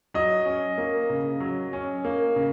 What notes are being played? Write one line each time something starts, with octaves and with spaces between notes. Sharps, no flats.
F#3 D#5
C#4
A#3
C#3
F#3
C#4
A#3
C#3